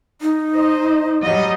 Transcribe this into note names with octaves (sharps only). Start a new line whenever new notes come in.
D#4
C5 D#5
F#3 G3 D#5